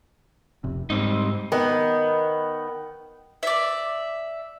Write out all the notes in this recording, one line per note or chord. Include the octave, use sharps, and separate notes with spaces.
F1 C3
G#2 G3 C4 D#4
D#3 B3
D5 E5